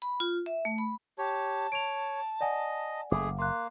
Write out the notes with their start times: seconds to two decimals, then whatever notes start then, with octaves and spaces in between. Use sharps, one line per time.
0.02 B5
0.20 F4
0.46 E5
0.65 A3
0.78 B5
1.18 G4 C#5 A5
1.72 C#5 D7 F7
2.41 D5 D#5 F#5 G#5
3.12 F#1 A3 G#4 D6
3.39 A#3 C6 F#6